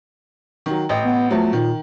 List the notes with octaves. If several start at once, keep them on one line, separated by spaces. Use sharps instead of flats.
D#3 F#3
A1 D#5 G5
B3
E2 F3 F#3 A3
A#2 D#3